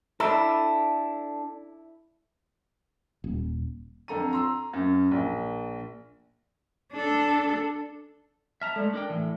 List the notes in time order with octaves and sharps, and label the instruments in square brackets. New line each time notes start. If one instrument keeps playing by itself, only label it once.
[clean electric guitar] D4 A4 [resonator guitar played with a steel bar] E4
[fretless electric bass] D#1
[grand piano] F2 D3 A4 A#5 D#7
A#5 C6 E6
F#2
A#1
[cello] D4 A4
[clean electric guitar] E5 A5 A#5 [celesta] F6 B6
[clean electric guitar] G#3 A3 [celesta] A4 D5
[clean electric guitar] D4 A#4 G5
A2 E3